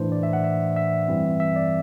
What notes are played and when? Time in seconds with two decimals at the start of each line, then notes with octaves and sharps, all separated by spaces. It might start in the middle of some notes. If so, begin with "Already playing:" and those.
Already playing: A2 E3 A3 D4 C5
0.12 D5
0.23 E5
0.33 F#5
0.44 E5
0.76 E5
1.08 G2 E3 G3 C4
1.40 E5
1.56 D5